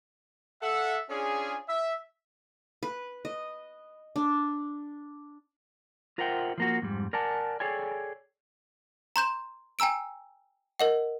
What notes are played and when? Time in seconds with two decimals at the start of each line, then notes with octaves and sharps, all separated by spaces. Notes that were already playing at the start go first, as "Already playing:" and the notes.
0.61 A4 E5 F#5
1.08 C#4 D4 F4 G#4
1.68 E5
2.83 B4
3.25 D#5
4.16 D4
6.18 F4 A#4 C5 E5 F#5 G5
6.58 F3 A#3 F#4
6.82 F2 G#2 G3
7.13 A#4 D5 F#5 G#5 A5
7.60 G#4 A4 C#5 D5 G5 G#5
9.16 A#5 C6 G6 E7
9.79 G5 G#5 A#5 E6 D7
10.80 A#4 D#5 F#5